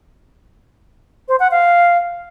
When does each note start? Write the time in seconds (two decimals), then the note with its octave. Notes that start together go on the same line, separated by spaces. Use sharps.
1.28 C5
1.40 F#5
1.51 F5